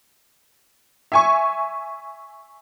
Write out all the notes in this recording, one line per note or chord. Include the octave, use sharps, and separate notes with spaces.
E5 G#5 C#6